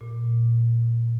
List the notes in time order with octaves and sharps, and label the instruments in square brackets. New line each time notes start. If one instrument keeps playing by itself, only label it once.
[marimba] A#2